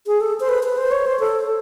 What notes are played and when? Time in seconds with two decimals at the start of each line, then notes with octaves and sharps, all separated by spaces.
0.07 G#4
0.21 A4
0.40 C5
0.49 B4
0.63 B4
0.77 C5
0.91 C#5
1.07 C5
1.20 A4